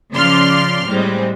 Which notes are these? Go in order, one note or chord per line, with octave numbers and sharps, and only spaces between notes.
C#3 F3 D5 C6 F6
A2 G3 G#3 C4